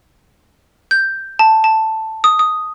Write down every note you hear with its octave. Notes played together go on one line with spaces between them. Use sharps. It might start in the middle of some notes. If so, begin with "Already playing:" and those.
G6
A5
A5
D#6
D#6